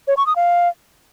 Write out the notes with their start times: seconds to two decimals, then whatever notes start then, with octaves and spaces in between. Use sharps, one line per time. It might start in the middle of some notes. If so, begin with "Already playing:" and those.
0.08 C#5
0.17 C#6
0.27 D#6
0.36 F5